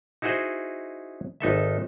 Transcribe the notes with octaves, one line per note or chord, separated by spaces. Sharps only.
D#4 E4 F#4 G#4 C5 D#5
G#1 D#4 A4 E5